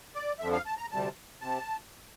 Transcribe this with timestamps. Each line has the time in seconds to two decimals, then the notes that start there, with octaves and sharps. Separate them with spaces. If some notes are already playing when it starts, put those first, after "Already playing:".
0.15 D5
0.39 F2 D3 F3 E5
0.53 F5
0.66 A5
0.77 A#5
0.91 D2 C3 G3 A5
1.41 C3 A5